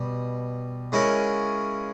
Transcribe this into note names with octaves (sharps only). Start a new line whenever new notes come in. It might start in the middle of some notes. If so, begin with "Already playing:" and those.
Already playing: B2 G3
C#3 G#3 C#4 E4 A#4